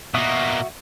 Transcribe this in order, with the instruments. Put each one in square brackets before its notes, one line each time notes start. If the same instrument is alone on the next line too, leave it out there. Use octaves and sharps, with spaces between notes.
[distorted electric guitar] B2 A#3 [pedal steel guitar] F#4 E5 D#6